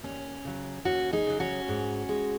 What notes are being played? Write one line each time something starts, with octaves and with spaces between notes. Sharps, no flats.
D#2 C#4
C#3 F#3
D#2 C#4 F#4
D#4 G#4
C#3 F#3
C#4 F#4
G#2
G#3